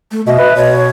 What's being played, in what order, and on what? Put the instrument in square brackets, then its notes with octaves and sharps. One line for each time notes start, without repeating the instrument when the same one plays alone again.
[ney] A3
[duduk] B2 [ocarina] D#5 [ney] E5
[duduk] B4
[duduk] B2 [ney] C#5